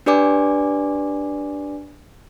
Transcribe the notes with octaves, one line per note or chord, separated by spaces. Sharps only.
D4 G4 B4 D5 G#5 D6